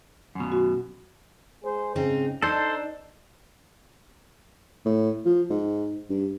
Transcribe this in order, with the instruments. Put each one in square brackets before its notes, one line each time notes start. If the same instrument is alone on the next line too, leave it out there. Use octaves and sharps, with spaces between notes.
[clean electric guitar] F#2 B2
[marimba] F#4
[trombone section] G#3 G#4 C5
[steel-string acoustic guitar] G#2 C4 D#4 [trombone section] C#3
[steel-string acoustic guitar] D4 [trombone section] D#4 [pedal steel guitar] A4 C5
[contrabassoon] A2
F3
G#2
G2